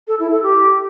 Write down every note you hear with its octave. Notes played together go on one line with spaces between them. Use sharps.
A4
E4
A4
G4